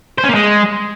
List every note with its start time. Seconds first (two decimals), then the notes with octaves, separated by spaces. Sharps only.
0.18 C5
0.24 C#4
0.29 A#3
0.35 G#3